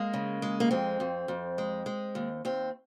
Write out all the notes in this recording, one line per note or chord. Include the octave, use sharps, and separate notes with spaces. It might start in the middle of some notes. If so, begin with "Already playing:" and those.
Already playing: G#3 A#3
C#3
G#3
A#3
F2 C4
F2
F2
G#3
G#3
D#2
D#2 C4